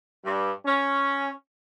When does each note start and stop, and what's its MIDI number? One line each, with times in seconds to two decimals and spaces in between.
0.24 0.51 43
0.66 1.28 61